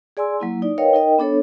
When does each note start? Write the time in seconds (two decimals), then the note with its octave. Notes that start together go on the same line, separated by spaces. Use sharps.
0.17 G#4 D5 G#5 C6 E6
0.40 F#3 A#3 E4
0.62 D#4 D5
0.78 A#4 B4 C#5 D#5 F5 G5
0.94 D#4 A#4 D#5 G5
1.18 B3 D4 A4 C#5